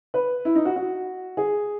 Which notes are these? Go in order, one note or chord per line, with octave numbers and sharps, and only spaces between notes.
B4
E4
D#4
F#4
F#4
G#4